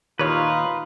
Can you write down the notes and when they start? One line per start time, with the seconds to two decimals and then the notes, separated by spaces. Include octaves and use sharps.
0.19 D#2 A#2 D#4 F4 B4 C#5 F5